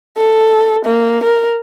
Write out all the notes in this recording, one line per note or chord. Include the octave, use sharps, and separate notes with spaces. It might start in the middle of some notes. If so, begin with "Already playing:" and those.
A4
A#3
A#4